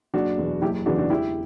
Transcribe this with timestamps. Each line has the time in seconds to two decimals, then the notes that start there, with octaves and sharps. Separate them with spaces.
0.13 F#1 D4 F#4
0.38 E2 B2
0.62 F#1 E4 G4
0.86 E2 C#3 E3 D4 F#4
0.98 D4 F#4
1.10 E1 E4 G4